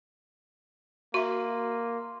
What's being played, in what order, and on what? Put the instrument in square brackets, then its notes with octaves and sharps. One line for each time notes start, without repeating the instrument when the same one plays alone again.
[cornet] A#3 [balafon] F#4 E5 [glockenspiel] C6